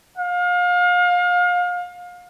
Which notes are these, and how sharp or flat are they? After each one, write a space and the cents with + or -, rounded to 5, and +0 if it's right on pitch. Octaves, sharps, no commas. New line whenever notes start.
F5 +35